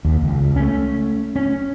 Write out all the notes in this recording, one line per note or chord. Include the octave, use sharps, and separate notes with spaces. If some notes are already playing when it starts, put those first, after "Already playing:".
D#2
C#2
A3 C#4
C#4